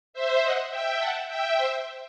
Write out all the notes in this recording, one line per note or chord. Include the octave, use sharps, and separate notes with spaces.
C5 E5
D#5 F#5
E5 G5
F#5 A5
E5 G5
C5 E5